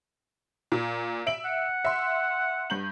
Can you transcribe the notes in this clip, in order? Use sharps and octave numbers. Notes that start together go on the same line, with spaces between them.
A#2
E5 D7 F#7
F#5
E5 C6
G2 G6 F#7